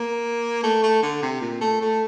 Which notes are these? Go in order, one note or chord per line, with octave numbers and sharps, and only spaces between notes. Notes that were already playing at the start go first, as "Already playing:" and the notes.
Already playing: A#3
A3
A3
D3
C3
A#2
A3
A3